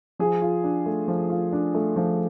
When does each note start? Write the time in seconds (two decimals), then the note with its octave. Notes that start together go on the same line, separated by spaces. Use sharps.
0.19 F3 G#4
0.42 F4
0.64 D4
0.86 A3
1.08 F3
1.30 F4
1.53 D4
1.75 A3
1.96 F3